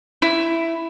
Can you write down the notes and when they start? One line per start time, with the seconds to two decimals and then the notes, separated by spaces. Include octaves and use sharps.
0.22 E4